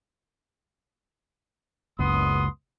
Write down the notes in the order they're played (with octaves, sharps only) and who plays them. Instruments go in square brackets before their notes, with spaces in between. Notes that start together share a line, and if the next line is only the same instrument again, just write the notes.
[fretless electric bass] F#1 C#2 [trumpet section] B3 C6 D#6